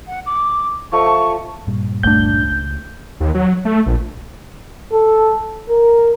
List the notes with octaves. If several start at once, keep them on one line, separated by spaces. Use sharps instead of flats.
F#5
D6
F3 A3 D#5 C#6
A5
G2 A#2 G3
G1 C#2 A3 D4 G6
C#2
D#2
F#3
A3
A#1
A4
A#4